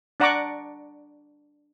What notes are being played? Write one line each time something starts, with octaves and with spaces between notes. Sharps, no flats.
D4 D5 F#5 A#5 C#6 D6